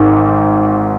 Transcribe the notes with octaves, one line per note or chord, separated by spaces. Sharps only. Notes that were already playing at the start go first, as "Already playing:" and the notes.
Already playing: G#1 G#2 D#3